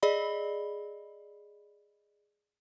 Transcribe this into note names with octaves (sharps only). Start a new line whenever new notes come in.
G#4 D5 D#5 B5